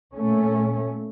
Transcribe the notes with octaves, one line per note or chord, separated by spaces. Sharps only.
A#2 A3 C#4